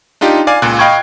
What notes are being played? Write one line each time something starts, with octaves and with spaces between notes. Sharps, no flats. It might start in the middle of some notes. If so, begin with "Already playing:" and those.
D4 D#4 F4 G4
D5 F5 G#5
C#2 A#2 F#6
D#5 F5 G5 B5 C#6 G#6